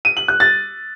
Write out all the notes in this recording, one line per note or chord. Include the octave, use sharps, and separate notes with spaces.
D#7
F#7
F#6
A6